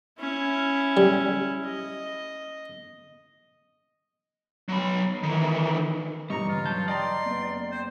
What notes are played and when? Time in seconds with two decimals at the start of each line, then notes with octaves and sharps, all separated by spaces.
0.19 C#4 E4
0.97 G3
1.65 D#5
4.69 F#3 B5
5.23 D#3 E3
6.30 B1 G2 E3 G3 D#5 A#5 C#6
6.49 C#2 G#2 F4
6.66 F#3 A5 G6
6.88 D5 D#5 G5 A#5 C6
7.25 F#1 B3
7.71 C5